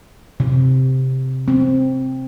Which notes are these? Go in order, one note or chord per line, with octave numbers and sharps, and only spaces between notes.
C3
C4